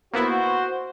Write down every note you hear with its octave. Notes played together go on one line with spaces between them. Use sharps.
A#3 B3 E4 F#4 C5